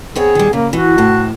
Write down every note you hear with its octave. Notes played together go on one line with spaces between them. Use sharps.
B3 C4 G#4 C#5
D#3 G3
C#3 A#3
E3 F#4
A2 C3 A5